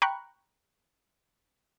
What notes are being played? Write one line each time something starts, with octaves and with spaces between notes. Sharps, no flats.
G5 A#5 B5 C#6 F#6